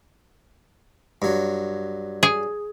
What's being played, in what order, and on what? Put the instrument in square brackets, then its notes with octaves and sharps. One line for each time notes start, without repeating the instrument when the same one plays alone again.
[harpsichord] G2 F#3
[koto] G#4